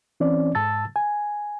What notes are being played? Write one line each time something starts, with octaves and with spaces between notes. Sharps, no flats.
E3 C4 C#4 D5
G#2 A5 E6 A6
G#5